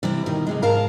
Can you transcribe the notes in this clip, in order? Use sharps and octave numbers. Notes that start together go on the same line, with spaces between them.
C3 E3 G3 C4
B2 D#3
F2 C3 G#3
G#2 A#4 F5 A5 A#5